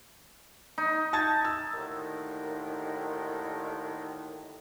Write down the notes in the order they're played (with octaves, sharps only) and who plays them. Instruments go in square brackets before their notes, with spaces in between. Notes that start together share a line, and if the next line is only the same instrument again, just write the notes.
[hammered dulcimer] D#4
[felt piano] A5 G#6 A6
E6
[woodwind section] D#2 A2 D3 D#3